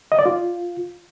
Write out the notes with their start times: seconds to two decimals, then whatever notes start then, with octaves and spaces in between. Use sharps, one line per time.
0.12 D#5
0.19 D5
0.26 F4